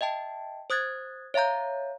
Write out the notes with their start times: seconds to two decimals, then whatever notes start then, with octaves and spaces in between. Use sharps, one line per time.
0.01 D#5 E5 G5 A5
0.70 C5 D#6 F#6 G#6 A6
1.34 C#5 E5 F5 A#5 G6